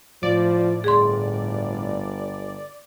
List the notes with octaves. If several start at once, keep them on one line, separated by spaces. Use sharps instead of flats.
A2 F3 D5
G1 G#4 C6